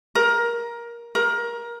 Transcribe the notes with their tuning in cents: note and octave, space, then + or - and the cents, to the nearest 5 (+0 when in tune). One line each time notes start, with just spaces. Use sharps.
A#4 +15
A#4 +20